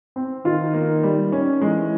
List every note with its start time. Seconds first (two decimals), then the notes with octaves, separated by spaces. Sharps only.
0.16 C4
0.45 D#3 F4
0.74 A#3
1.03 G3
1.32 C#4
1.61 E3 G#3